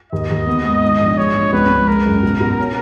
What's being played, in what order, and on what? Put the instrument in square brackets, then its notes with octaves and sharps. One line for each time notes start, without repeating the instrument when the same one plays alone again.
[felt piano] D#2 [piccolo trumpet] D#5
[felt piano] D#2
B3
G#2
D#4
A#1
[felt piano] G#3 [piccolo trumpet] C#5
[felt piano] A#1
[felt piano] C#2 [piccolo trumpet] B4
[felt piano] C#2
[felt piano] G#3 [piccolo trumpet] A#4
[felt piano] F#1
B2
B2
C#4